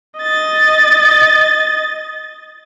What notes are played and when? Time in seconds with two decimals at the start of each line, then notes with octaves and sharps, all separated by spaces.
0.20 D#5 A6